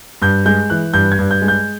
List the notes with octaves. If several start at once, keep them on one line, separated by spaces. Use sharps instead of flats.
G2 G6
G#3 G6
E3 F#6
G2 G6
G#6
G2
G6
G#3
G6